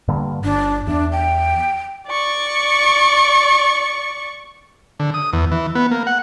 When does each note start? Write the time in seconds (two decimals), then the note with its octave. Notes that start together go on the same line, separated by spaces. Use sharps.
0.08 G2 D3 A#3
0.44 G1 D4
0.87 E2 D4
1.12 G5
2.08 D5 C#6
5.00 D3
5.14 D#6
5.33 E2
5.51 E3
5.75 B3
5.91 A#3
6.07 F#5